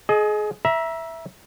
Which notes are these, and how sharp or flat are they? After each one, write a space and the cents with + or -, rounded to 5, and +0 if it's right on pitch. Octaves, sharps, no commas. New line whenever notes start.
G#4 +30 D#5 +0
E5 +0 A#5 +35